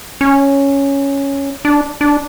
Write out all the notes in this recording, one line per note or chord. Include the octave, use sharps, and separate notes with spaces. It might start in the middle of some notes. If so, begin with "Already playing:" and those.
C#4
D4
D4